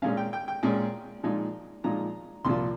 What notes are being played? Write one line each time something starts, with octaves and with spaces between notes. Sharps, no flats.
A#2 G#3 C#4 F5
G5
G5
G5
A#2 G#3 C#4
A#2 F3 G#3 D#4
A#2 F3 G#3 D#4 A#5
C2 A#2 F3 C6